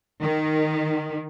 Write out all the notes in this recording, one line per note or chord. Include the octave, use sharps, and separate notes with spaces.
D#3